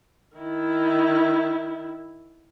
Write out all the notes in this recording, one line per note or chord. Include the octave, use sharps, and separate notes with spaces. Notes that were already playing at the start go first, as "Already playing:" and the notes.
D#3 E4